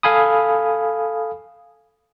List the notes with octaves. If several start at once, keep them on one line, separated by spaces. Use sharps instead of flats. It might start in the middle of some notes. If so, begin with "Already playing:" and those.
A4 F5 G#5 B5 D#6